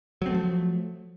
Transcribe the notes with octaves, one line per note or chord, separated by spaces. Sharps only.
F3 F#3 A3 C4